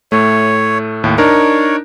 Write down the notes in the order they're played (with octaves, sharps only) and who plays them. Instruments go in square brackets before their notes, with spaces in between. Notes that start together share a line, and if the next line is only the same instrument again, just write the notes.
[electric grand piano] A2 A3 [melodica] C#5
[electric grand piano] D#2 A2
[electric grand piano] D4 D#4 A#4 [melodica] C#5